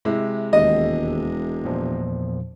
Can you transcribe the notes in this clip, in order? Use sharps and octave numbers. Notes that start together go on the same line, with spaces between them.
C3 G#3 E4
E1 D#2 D#5
E2 A#2 F3